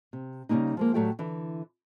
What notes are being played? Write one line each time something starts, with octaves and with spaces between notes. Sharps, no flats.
C3
C#3 G3 G#3 A#3 D#4
F3 G#3 A#3
A2 F#3 G3 A3 G4 G5
D3 E3